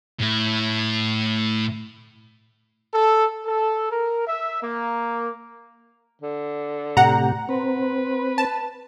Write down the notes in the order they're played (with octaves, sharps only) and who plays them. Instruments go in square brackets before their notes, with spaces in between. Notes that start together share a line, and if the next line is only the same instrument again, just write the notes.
[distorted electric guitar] A2 E4
[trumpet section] A4
A4
A#4
E5
A#3
[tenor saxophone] D3
[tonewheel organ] A2 C3 G4 [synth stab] F#5 A#5
[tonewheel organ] C4 [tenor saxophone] B4
[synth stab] A5